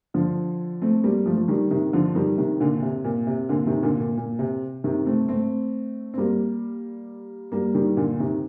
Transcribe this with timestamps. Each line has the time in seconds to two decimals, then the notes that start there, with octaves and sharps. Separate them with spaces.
0.14 D3 F3
0.82 A3 C4
1.04 G3 A#3
1.26 F3 A3
1.37 F3
1.48 D#3 G3
1.71 C3 D#3
1.93 D3 F3
2.15 D#3 G3
2.37 C3 D#3
2.60 A#2 D3
2.82 C3
3.04 A#2
3.27 C3
3.49 A#2 D3
3.67 C3 D#3
3.83 A#2 D3
4.00 A#2
4.17 A#2
4.39 C3
4.84 C3 D#3
5.06 A3 C4
5.29 A3 C4
6.14 C4
6.18 G3 A#3
7.52 G3 A#3
7.75 D#3 G3
7.97 A#2 D3
8.20 C3 D#3